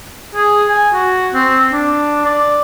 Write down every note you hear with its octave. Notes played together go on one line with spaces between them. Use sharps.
G#4
G#5
F#4
C4
D4
D5